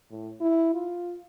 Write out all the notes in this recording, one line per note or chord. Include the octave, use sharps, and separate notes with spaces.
A2
E4
F4